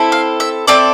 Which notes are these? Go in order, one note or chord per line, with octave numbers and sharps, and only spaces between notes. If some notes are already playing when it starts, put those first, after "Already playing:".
Already playing: C4 E4 A4
F5
E5
C4 E4 A4 D5